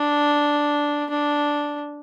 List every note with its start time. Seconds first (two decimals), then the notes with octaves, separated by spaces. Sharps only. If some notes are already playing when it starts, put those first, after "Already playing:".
Already playing: D4
1.10 D4